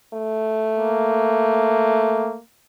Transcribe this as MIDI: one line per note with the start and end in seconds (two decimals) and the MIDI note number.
0.14 2.36 57
0.78 2.42 58